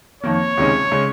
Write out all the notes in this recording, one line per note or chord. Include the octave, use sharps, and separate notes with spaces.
F2 D#3 A#3 C#5
C#2 C3 D#3 G#3 C#4
C#3 G#3 C#4